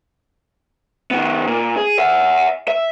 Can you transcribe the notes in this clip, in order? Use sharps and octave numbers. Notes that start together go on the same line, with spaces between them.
D#3 B3
A#2
G#4
E5 F#5
E5